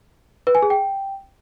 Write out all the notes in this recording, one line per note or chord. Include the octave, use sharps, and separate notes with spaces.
B4
G#5
G#4
G5